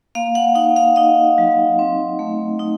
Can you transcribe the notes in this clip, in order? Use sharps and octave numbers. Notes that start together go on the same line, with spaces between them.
A#3 F5
F#5
D#4 F#5
F5
D#4 D#5
F#3
C4
A3
D#4